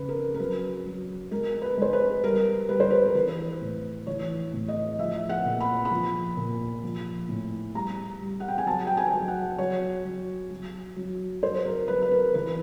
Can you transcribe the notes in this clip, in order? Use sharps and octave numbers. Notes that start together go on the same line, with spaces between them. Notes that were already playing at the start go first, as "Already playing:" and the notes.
Already playing: C#3 B4
A#4
A#4
F#3 B4
F#3
G#3 A#4
B4
G#3 C5
B4
G3 A#4
G3 B4
C5
B4
A#4
E3 B4
A2
E3 C#5
A2
D#5
F3 E5
F#5
A#2
B5
B5
F3
A#2
F3
A2
G3 A#5
G3
F#5
G5
G#5
F#3 A5
G5
G#5
F#3
F#5
F#3 C#5
F#3
F#3
F#3
F#3 C5
A#4
F#3 B4
B4
A#4
E3 B4